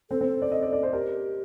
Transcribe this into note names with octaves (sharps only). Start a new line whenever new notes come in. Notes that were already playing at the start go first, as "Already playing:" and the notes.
C4 A4
C4
D5
D#5
D5
D5
C5
G4 A#4